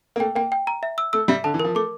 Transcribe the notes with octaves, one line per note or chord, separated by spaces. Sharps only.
A#3
A3 G5
A#3 G5
G5
A#5
E5
E6
A3 E6
G3 E5
D3 A5
E3
F3 A#4
A3 D6